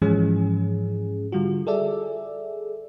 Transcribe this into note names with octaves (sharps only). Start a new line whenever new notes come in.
G#2 E3 F3 G#3 C#4 G#4
D3 G3 F4 F#4
G#4 A4 D5 E5